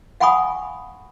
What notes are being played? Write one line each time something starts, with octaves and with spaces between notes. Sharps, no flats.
F5 F#5 G#5 B5 C#6 D#6